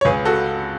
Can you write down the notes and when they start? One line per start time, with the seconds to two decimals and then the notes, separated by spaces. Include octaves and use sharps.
0.01 C#5
0.05 C#2 G#4 B4
0.25 F#4 A4